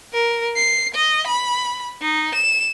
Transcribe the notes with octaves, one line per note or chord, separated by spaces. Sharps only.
A#4
C7
D#5
B5
D#4
E7